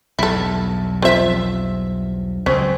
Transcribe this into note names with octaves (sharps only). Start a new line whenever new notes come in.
B1 E2 G2 E4 A4
F3 C4 E5
C#2 F#3 C4 C#4 G#4